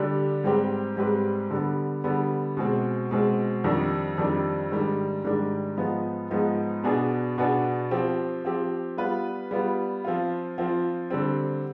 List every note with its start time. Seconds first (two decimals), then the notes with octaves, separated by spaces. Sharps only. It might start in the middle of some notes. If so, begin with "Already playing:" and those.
Already playing: D3 G3 D4 G4
0.44 G#2 G3 C4 G4 B4
0.97 G#2 G3 C4 G4 B4
1.51 D3 G3 B3
2.04 D3 G3 B3
2.57 B2 G#3 C4
3.11 B2 G#3 C4
3.64 F2 D#3 G3 D4
4.18 F2 D#3 G3 D4
4.71 G#2 D#3 G3 D4
5.24 G#2 D#3 G3 D4
5.77 G#2 F3 B3 D#4
6.30 G#2 F3 B3 D#4
6.84 B2 B3 D4 G#4
7.38 B2 B3 D4 G#4
7.91 F3 C4 G4
8.45 F3 C4 G4
8.97 G3 B3 F4 B4
9.51 G3 B3 F4 B4
10.04 F3 C4 F4
10.58 F3 C4 F4
11.10 D3 G3 C4